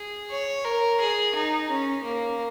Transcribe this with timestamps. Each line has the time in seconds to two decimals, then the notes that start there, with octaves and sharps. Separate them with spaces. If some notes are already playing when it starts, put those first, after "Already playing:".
Already playing: G#4
0.31 C#5
0.65 A#4
1.00 G#4
1.35 D#4
1.70 C#4
2.04 A#3